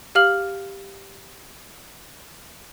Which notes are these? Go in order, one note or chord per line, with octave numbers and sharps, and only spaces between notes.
G4 F5 F6 F#7